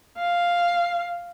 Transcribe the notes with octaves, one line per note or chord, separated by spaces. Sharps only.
F5